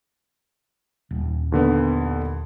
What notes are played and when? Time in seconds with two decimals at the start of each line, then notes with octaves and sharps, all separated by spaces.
1.11 D#1
1.52 D#2 D3 B3